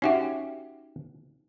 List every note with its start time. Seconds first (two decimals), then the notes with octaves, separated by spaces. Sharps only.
0.02 C#4 D#4 F#4 G4 E5